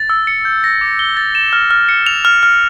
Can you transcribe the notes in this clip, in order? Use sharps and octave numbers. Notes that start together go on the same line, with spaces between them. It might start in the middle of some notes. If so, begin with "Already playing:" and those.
Already playing: A6
E6
C#7
G6
A#6
D6
G7
A6
E7
F6
F6
C#7
F7
F6
F6